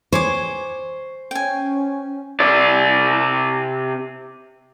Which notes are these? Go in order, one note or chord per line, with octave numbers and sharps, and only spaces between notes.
C5 C#5 G#5 D6
C#4 G5 G#5
C3 D5